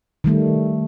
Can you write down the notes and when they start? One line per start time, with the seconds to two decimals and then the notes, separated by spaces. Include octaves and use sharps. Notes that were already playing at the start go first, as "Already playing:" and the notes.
0.24 D#3 G3 A3